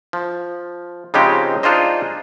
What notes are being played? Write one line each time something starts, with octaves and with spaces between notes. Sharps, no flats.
F3
C#3 F3 G#3 C4 D#4 G4
D4 D#4 F4 G#4 C5 D#5